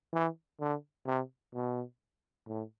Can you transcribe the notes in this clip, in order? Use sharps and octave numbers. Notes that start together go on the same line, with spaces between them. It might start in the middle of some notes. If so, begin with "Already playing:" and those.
E3
D3
C3
B2
A2